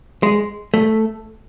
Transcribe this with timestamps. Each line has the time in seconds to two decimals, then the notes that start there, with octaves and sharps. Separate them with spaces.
0.23 G#3
0.74 A3